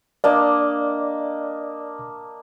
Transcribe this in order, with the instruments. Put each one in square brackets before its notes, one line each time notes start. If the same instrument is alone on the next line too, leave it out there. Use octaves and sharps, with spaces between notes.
[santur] A#3 D4 D#5 [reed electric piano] D5